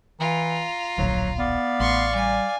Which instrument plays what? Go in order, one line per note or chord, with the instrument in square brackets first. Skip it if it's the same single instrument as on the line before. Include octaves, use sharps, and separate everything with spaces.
[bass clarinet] E3 [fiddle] F4 [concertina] A#5
[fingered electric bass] D1 A#1 [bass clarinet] F#3
[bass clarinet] B3 [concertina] D5 F5
[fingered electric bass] A1 [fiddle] C6 C#6
[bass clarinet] G3 [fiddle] G#5